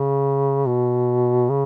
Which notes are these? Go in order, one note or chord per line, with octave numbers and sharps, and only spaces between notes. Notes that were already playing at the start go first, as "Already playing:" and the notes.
Already playing: C#3
B2
C#3